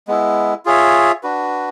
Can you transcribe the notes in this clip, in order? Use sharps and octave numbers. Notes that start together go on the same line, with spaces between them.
G#3 B3 E4
F4 G#4 C#5 E5
D4 F#4 B4